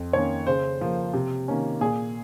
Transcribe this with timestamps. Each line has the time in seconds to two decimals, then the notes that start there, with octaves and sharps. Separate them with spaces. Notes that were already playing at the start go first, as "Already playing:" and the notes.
Already playing: F2
0.13 D#3 A#3 C#4 C#5
0.47 C#3 C5
0.81 F3 A#3
1.13 C3
1.48 D#3 A#3 C#4
1.81 A#2 G#4